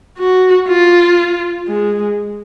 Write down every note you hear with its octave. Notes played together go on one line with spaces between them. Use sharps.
F#4
F4
G#3